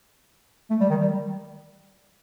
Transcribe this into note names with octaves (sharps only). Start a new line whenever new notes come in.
A3
G3
D#3
G3